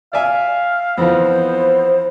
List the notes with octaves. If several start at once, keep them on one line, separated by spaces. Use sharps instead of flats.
D5 E5 F5 G#5
F2 E3 F3 B3 C5